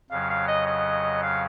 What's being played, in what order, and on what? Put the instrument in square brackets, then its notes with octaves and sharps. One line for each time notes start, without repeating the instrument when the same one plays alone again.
[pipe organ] F2 C#3 F#3 [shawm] F5
[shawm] F5
D#5
D#5
F5